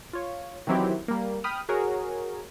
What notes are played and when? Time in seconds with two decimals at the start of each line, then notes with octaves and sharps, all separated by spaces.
0.13 F4 C#5
0.67 D#3 E3 F#3 C4 E4 G4
1.08 G3 A#3
1.44 G5 B5 D#6 F6
1.69 F#4 G#4 A#4 C#5